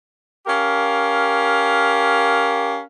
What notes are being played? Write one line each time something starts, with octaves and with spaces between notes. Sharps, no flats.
C#4 G4 A#4 F5